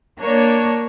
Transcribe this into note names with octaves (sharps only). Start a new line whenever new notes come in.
A#3 D4 C#5